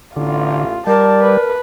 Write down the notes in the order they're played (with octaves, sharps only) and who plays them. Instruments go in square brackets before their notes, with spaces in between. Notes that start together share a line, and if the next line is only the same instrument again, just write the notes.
[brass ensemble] A1 [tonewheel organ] D3 [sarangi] F4
[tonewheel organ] G3 [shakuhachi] A#4 [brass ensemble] D5 [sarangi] A5
[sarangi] B4